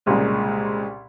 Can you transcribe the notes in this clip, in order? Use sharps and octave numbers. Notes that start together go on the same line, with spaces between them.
C2 A#2 C#3 G#3